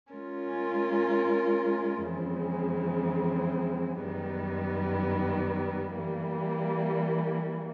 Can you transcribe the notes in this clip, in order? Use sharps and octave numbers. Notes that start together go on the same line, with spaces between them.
G#3 C#4 F4 A#4
F2 C#3 E3 G#3 C4
F#2 D#3 G3 B3
E3 G3 A#3